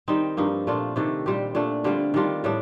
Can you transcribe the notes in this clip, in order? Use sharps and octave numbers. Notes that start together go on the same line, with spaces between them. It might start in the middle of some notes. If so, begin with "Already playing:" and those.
D#3 G3 C4 D#4
G2 F3 A#3 D#4
A#2 A3 D4 F4
C3 D#3 A3 D4
A#2 G3 C4 G4
A#2 A3 D4
D3 G3 C4 F4
D#3 G3 D4 F4
A2 G3 D4